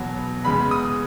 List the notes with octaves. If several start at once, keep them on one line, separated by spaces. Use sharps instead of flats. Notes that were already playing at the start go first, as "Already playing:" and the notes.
Already playing: E2 B2 F#3 B3
E2 C#3 G#3 B3 B5
D#6